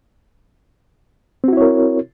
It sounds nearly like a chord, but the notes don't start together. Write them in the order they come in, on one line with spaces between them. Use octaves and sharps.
C4 F#4 E4 C#5 A#4